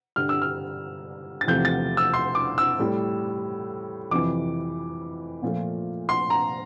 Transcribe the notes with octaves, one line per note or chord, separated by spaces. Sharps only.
G2 D3 G3 F6
E6
F6
A6
E2 C3 F3 A3 G6
A6
E6
C6
D6
E6
A2 G3
F2 C3 E3 D6
A#2 F3 A3
C6
A#5